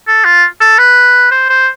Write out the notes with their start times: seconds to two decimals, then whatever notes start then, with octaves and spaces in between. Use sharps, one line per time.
0.08 A4
0.25 F4
0.61 A4
0.79 B4
1.31 C5
1.49 C5